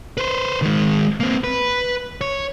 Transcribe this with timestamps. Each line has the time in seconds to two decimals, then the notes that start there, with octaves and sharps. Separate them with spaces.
0.17 B4 C5
0.62 D#3 G#3
1.20 A#3 C4
1.44 B4
2.21 C#5